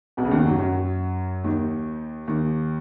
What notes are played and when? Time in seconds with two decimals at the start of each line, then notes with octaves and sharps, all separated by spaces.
0.17 B1 B2
0.25 C#3
0.31 D#2 D#3
0.45 F#2 F#3
0.59 F#2 F#3
1.44 D#2 D#3
2.28 D#2 D#3